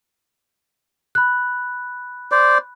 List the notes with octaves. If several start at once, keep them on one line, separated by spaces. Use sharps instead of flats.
B5 F#6
C5 D5